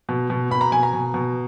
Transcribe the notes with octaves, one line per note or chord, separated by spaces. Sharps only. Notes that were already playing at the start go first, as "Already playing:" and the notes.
B2
B2
B2 B5
A#5
B2 G#5
A#5
B2
B2